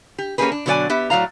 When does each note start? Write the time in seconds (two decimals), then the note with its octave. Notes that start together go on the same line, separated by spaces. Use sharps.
0.18 G4
0.38 A#3 C#4 D#4 G4 G#4 B4
0.52 D4
0.66 B2 D3 F#3 A#3 D5 G#5
0.90 B3 G4 E5
1.10 A2 F#3 D5 F5 A#5